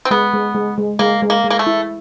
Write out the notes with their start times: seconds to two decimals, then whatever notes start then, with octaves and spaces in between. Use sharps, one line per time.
0.05 C4
0.11 G#3 B3
0.33 G#3
0.55 G#3
0.78 G#3
0.99 G#3 A#3
1.22 G#3
1.30 A#3
1.45 G#3
1.50 A#3
1.59 A3
1.67 E4